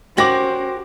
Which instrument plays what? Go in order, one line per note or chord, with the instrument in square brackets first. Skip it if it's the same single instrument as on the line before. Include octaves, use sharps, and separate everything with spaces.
[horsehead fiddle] C#4 C5 [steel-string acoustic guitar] F#4 G4 A#4 [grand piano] D6 A#6 F#7